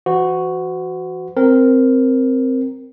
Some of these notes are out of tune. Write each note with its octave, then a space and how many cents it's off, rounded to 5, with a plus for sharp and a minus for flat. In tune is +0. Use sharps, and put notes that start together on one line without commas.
E3 +30 F#4 +0 C5 -45
C4 +0 A#4 +0